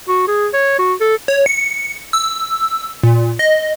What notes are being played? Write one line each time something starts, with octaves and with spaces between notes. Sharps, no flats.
F#4
G#4
C#5
F#4
A4
C#5
C#7
E6
A#2
D#5